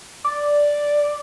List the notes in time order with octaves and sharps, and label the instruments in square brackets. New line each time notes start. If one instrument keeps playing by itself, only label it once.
[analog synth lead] D5